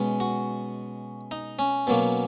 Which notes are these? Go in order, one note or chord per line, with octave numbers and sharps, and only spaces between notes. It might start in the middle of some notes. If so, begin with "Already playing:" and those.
Already playing: B2 G#3 C#4
F#4
D#4
C#4
B2 F#3 A#3